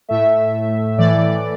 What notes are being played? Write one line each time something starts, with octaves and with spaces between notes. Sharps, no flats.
A2 A3 E5
A2 E3 A3 D5